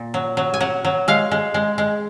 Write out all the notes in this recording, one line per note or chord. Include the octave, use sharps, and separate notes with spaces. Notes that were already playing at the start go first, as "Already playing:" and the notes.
Already playing: A#2
F#3
F#3
G#5
F#3 F#5
F#3
G#3 F5
G#3
G#3
G#3